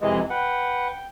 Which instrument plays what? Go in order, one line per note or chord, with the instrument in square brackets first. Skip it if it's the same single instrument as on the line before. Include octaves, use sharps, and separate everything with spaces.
[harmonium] F2 G#4 D#5 [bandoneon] C3 E3 G#3
[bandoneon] B4 F#5 [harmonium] G5